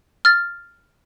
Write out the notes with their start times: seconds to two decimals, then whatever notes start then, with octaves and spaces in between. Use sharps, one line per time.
0.25 F6 A6